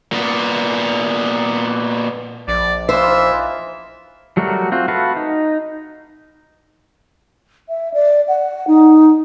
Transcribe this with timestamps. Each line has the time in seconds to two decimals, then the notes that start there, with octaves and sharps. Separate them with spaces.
0.12 A#2 B3
2.48 A#1 D5
2.89 E3 D#4 F4 C5 E5
4.37 F#3 G3 A3 F#4 A#4
4.72 C4 F4 F#4
4.88 F#4 A4 B4 E5 F5
5.16 D#4
7.69 E5
7.94 D5
8.28 F#5
8.67 D#4